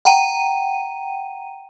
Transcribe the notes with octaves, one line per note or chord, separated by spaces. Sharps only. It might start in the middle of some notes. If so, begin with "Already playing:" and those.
F#5 G5 A#5 D#7